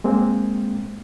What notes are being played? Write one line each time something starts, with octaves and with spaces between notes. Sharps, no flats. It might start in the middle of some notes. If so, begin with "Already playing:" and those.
G#3 A#3 C4